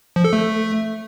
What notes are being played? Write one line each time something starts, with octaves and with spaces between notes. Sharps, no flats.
F3
A4
A3